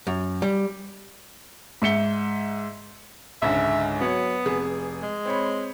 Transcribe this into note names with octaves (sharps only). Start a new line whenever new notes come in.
F#2
G3
G#2 E5 C#7 G7
C#2 G#2 D3 E5
F#3 B3 C#5
F1 G#4
G#3
C4 C#5 B5